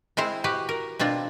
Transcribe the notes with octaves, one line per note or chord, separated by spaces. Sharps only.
G#3 C4 E4 C5
F#4 G4 B4
A#4
B2 C4 D4 F4